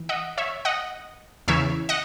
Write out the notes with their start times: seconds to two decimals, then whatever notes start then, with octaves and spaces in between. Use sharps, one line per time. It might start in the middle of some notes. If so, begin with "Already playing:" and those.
Already playing: E3
0.09 D#5 F#5
0.38 C#5 E5
0.65 D#5 F#5
1.48 E2 C#3 E3 C#5 E5
1.89 D#5 F#5